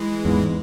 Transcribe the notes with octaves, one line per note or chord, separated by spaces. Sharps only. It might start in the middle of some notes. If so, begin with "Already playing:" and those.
Already playing: E3 G#3
E2 G#2